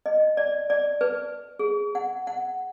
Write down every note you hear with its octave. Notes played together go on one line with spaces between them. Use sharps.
D#5
D5
D5
B4
G#4
F#5
F#5